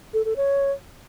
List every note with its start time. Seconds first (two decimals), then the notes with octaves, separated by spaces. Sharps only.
0.14 A4
0.25 A4
0.37 C#5